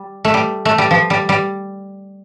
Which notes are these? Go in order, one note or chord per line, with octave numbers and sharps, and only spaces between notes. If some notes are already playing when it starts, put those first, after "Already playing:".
Already playing: G3
A3
G3
A3
G3
F3
G3
G3